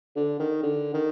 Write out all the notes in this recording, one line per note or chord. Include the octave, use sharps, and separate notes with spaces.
D3
D#3
D3
D#3